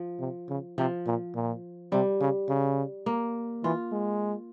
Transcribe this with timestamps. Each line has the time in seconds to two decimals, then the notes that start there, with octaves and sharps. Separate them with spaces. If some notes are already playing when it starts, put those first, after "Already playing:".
Already playing: F3
0.20 C3
0.49 C#3
0.78 C3 F3
1.06 A#2
1.35 A#2
1.92 C3 G3
2.20 C#3
2.49 C#3
3.06 A#3
3.64 E3 F4
3.92 G#3